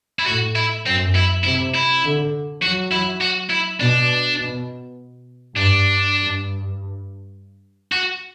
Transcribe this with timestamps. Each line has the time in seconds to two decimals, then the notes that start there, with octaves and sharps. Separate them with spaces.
0.19 E4
0.27 A2 F#4
0.56 E4
0.85 F#2 C4
1.15 E4
1.44 C3 E4
1.74 E4
2.04 D3
2.62 F#3 F#4
2.92 E4
3.21 F#4
3.50 E4
3.80 B2 D4
4.39 B2
5.56 G2 D4
6.16 G2
7.92 F#4